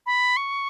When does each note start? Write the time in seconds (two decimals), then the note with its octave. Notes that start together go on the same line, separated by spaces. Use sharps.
0.06 B5
0.37 C#6